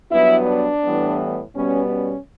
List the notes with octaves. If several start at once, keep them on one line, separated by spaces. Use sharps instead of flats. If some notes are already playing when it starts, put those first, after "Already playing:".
G2 F#3 B3 E4
D4
A2 E3 G3 B3
B2 G3 B3 C#4
C#4